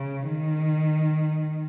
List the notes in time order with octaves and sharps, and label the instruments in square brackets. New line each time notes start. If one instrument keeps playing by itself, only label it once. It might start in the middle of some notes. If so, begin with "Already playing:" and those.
Already playing: [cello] C#3
D#3